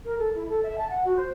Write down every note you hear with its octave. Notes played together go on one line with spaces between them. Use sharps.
A#4
A4
E4
A4
E5
A5
F#5
F#4
C5